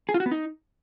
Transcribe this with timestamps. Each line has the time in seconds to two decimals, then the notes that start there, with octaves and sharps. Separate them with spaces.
0.09 G#4
0.14 F4
0.20 F#4
0.26 B3
0.31 D#4